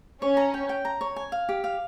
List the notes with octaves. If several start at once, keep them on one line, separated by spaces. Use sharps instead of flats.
C#4 C#5
A#5
G5
G5
A#5
C#5
G#5
F5
G4
F5